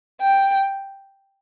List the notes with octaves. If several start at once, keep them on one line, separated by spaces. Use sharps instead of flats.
G5